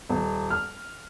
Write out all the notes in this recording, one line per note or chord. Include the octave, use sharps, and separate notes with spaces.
D#1
F6